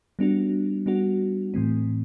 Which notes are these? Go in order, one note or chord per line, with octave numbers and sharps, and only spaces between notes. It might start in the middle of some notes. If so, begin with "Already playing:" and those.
G3 B3 D4 F#4
G3 B3 D4 F#4
A2 E3 A3 C4